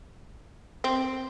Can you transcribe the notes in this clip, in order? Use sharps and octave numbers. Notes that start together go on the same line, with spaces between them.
C4